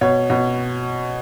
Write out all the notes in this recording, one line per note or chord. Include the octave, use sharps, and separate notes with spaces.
B2 C#5
B2